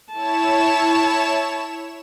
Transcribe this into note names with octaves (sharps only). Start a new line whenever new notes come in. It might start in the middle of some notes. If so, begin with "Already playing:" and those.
E4 C#5 A5 E7